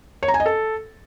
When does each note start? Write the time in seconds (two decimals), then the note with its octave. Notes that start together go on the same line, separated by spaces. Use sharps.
0.23 C#5
0.28 A#5
0.34 G#5
0.40 D#5
0.46 A4